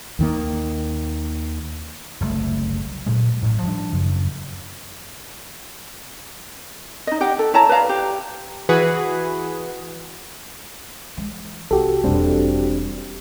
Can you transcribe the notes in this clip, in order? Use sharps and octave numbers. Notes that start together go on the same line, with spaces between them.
D#2 D#3 A#3
F#1 C2 C3 A3
A#2 F#3 G#3
A1 A2
F3 G3 D4
F#2 C#3
D#4 D#5
G4 F#5 G5
A4
E4 C#5 A5 A#5
B4 D5 F5 A#5
G4
E3 F#4 G#4 B4
E3 G#3
C2 F#4 G4 A4
E1 B2 G3 C4 D4